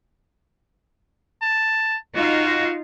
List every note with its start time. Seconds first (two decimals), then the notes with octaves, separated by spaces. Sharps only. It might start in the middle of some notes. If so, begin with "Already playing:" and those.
1.42 A5
2.16 D#4 F4 F#4 F5